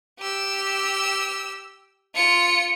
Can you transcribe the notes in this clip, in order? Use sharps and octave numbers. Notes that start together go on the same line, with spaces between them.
G4 E6
F4 C#7